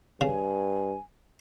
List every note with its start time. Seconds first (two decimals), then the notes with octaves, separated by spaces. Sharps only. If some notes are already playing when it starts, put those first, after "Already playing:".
0.21 G2 C#3 G#5